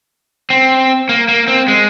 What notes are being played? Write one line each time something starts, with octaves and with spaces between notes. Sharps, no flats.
C4
A#3
A#3
C4
G#3